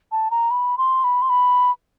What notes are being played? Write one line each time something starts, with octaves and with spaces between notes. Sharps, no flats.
A5
A#5
B5
C6
B5
C6
B5